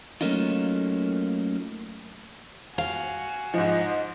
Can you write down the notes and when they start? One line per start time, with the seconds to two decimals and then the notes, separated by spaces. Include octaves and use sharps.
0.21 F#3 A3 A#3 C#4 D#4 F4
2.78 F#4 F5 G#5
3.54 G#2 F3 D#5